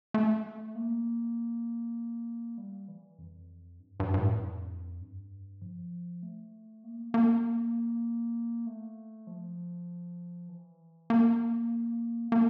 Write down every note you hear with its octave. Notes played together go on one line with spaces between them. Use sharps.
A3
A#3
G3
E3
F2
G2
G2
G2
A2
F2
G2
F3
A3
A#3
A#3
A3
F3
E3
A#3
A#3